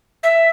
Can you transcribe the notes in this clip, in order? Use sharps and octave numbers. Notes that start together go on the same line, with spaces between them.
E5